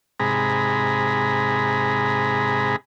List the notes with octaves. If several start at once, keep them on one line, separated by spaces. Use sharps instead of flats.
G#2 C3 G#4 A#5 B5